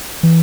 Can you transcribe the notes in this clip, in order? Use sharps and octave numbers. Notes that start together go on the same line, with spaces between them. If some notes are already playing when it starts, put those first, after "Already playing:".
E3